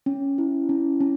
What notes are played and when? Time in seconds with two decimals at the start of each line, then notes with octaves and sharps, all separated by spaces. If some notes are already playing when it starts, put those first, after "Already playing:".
0.06 C#4
0.38 E4
0.69 C#4
1.01 C#4